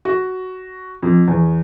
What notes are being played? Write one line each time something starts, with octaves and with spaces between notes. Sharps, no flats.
F#4
F2
E2